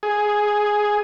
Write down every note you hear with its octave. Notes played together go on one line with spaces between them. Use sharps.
G#4